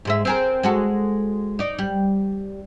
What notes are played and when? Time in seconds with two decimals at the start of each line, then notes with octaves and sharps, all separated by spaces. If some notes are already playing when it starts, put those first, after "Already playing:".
0.05 G#2 G#3 E5
0.25 C4 G#4 A#4
0.63 G#3 F#4 A4
1.59 D#4 D5
1.79 G3